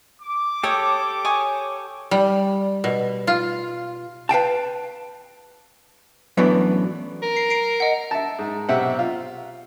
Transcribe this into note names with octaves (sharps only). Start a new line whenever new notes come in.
D6
G4 A4 C#5 D#6
C#5 G#5 D#6
G3
B2
F4
B4 F5 G5 A5
F#2 A2 E3 F#3 B3 D4
A#4
C7
C7 D7
D#5 F#5
E5 A5
G#2
B1 C3 C4 E5 F#5
F4